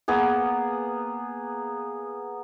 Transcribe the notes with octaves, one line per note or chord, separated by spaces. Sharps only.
A#3 B3 G#4